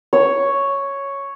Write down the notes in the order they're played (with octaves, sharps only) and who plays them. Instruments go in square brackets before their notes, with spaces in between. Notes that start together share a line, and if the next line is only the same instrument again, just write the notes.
[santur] C#5